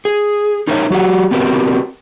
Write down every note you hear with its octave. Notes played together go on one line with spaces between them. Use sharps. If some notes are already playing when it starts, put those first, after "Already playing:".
G#4
D#4 A#4 C5 C#5 E5
F#3 F#4 G4 F#5
B3 C4 F#4 G4 A#4 B4